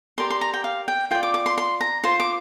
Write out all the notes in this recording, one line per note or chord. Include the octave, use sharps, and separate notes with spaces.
G4 A#4 D5 C6
C6
A#5
G5
F5
G5
F4 D5 G5
D6
D6
C6
C6
A#5
F4 C5 C6
D6